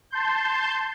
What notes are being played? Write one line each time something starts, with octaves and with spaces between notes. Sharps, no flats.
A5 C6 G6